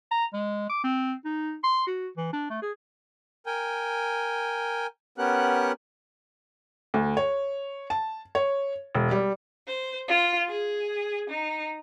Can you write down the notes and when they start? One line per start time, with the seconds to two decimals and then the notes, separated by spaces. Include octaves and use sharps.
0.11 A#5
0.34 G#3
0.69 D6
0.84 C4
1.25 D#4
1.64 C6
1.87 F#4
2.17 E3
2.33 D4
2.50 A3
2.62 G#4
3.46 A#4 G5 G#5
5.18 B3 C#4 G4 A#4 F#5 F#6
6.94 D2
7.17 C#5
7.90 A5
8.35 C#5
8.95 E1
9.11 G3
9.68 C5
10.09 F4
10.49 G#4
11.30 D#4